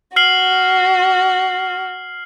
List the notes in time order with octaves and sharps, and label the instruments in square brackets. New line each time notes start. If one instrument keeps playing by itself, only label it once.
[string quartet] F#4 [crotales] F6 C7 F#7